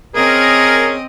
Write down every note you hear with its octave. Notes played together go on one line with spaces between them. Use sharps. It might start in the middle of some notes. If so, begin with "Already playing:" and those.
C4 C#4 G#4 A#4 D#5